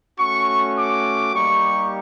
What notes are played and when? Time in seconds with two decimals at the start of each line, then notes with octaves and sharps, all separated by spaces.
0.18 A3 C#4 F#4 C#6
0.76 D6
1.34 G3 A#3 D#4 G4 C#6